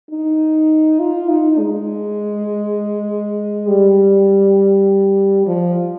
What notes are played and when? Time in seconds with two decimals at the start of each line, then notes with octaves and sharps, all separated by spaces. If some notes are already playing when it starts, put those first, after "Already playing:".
0.10 D#4
1.00 F4
1.29 D#4
1.59 G#3
3.68 G3
5.47 F3